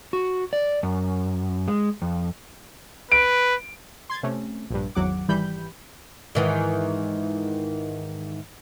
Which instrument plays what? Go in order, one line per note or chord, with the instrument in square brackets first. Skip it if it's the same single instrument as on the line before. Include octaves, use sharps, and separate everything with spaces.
[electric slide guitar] F#4
D5
F#2
G#3
F2
[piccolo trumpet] B4 [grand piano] D7
[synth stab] C6 G#6 A6
C3 A3 C#4
A#1 G2
G#1 E2 F#3 F#5 D6
G#1 E3 G3 B5 G6
[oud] G#2 D#3 E3